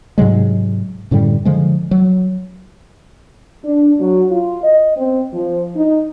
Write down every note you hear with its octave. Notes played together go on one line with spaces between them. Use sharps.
G#2 C3 F#3 G#3
F#2 A2 D3 G3
D3 F3 G#3
F#3
D4
F#3
F4
D#5
C4
F3
D#4